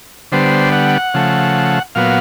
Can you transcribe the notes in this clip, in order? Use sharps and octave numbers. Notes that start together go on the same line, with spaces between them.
D3 G3 B3 C5
F#5
C#3 F3 A3
A#2 F#3 B3 F5